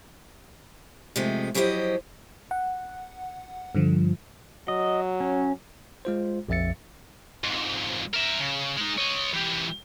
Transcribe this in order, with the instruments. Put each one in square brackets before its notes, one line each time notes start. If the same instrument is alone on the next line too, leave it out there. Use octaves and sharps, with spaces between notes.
[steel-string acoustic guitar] C3 F3 G#3 A3
F3 F#3 E4 G4 C5 D#5
[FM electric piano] F#5
G2 D3 F3
[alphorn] F#3 [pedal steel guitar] D#5
[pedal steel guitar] C#4
[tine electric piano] G#3 F4 C5
A#1 F2 F3 E5 A6 C#7
[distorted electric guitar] F2 G#2
A#4 E5
C#3
G#3 D#4
C#5 D#5
E3 G4